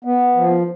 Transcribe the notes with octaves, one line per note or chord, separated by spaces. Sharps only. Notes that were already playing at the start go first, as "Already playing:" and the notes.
B3
F3